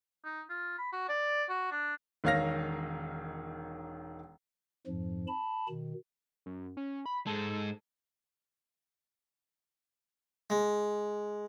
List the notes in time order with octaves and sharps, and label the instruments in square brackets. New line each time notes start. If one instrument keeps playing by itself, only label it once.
[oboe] D#4
F4
B5
F#4
D5
F#4
D4
[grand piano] E1 D#3 C#5 F5 F6 A#6
[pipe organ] F2 G#2 F3
A5 B5
B2 D#3
[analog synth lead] F#2
C#4
B5
[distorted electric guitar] G#2 G#3 [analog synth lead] A4
[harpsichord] G#3